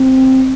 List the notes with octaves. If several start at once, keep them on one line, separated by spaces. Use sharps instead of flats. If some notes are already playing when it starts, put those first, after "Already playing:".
Already playing: C4